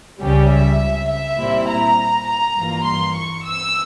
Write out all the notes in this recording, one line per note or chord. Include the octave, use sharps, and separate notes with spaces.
C#2 C#3 G3 C#4 G4
E5
E5
A#2 G3 C4 E4
A#5
A#5
G2 E3 A#3 F4
C6
C#6
E6